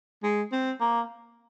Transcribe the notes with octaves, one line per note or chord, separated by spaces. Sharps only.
G#3
C4
A#3